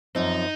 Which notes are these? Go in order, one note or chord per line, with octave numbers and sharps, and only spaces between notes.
F#2 F3 C4 D#4